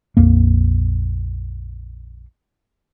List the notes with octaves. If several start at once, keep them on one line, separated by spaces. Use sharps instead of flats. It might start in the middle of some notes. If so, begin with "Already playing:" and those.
A#1 F2 A#3